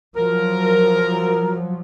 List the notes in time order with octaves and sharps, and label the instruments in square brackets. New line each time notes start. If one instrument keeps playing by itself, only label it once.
[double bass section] F3 F#3 [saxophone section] A#4